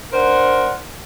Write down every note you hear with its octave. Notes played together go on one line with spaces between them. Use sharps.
D4 A#4 C5 F#5